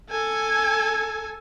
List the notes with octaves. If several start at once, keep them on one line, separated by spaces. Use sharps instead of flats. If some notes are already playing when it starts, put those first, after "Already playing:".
A4 G#5